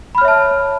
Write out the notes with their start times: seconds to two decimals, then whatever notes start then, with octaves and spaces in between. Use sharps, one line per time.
0.15 B5
0.18 F6
0.21 C#5
0.25 E5
0.28 A5